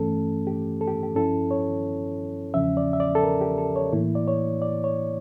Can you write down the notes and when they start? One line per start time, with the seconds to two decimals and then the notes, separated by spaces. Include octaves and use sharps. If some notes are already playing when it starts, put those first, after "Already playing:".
Already playing: G2 E3 A3 C#4 A4
0.47 G4
0.81 A4
0.88 G4
1.03 G4
1.15 G2 F3 C#4 E4 A4
1.51 C#5
2.54 E2 C#3 F3 C#4 E5
2.77 D5
2.93 E5
3.00 D5
3.15 A4
3.24 A#4
3.41 G4
3.58 A4
3.76 C#5
3.93 A2 E3 A#3 E4
4.15 D5
4.28 C#5
4.62 D5
4.84 C#5